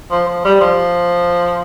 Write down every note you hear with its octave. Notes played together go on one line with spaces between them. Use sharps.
F3
F3
G3
F3